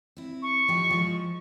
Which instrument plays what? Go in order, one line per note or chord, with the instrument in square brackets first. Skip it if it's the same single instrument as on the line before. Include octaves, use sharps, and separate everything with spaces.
[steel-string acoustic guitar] C4 E4
[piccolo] C#6
[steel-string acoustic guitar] F3 D#4 G4
F3 G#3